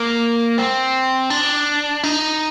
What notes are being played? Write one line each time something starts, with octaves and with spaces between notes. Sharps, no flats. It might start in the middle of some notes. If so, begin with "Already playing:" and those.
Already playing: A#3
C4
D4
D#4